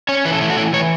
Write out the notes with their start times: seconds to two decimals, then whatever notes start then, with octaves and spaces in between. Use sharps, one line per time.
0.09 C#4 C#5
0.25 E3 B4
0.33 A4
0.41 A3 E4
0.50 F#4
0.57 E3 E4
0.73 E3 C#5